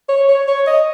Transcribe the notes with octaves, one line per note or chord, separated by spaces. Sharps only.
C#5
C#5
C#5
D#5